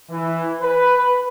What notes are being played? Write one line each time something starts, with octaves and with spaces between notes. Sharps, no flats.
E3
B4